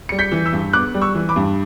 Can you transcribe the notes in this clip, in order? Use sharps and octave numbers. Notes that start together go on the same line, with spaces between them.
G3 C#7
G6 B6
E3
E6 G6
G2
B3 D6 F#6
G3
C#6 E6
E3
B5 D6
G2